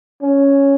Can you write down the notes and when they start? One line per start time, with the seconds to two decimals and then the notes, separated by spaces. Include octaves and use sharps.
0.22 C#4